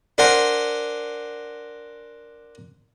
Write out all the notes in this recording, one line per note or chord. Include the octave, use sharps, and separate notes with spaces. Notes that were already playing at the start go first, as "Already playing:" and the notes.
D4 A#4 C5 F#5 G#5